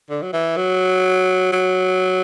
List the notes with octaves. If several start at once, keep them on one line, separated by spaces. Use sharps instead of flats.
D3
F#3
E3
F#3
F#3